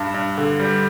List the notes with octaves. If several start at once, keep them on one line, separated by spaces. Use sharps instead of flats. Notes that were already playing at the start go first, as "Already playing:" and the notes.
Already playing: G2
G2
D3
G3